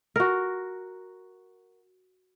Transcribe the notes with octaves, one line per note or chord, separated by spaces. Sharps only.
F#4 A#4